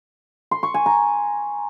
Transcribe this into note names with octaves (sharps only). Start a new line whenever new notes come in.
C6
C#6
G#5
A#5